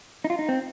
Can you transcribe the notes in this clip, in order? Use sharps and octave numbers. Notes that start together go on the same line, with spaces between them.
D#4
F4
D#4
C4